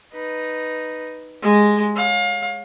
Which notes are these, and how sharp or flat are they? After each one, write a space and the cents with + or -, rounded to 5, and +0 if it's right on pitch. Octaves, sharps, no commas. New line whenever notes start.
D#4 +0 B4 +0
G#3 +0 G4 +0
C#5 +0 F5 +30